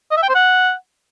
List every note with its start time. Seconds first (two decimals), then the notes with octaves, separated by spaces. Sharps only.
0.11 D#5
0.17 E5
0.23 G5
0.29 C5
0.35 F#5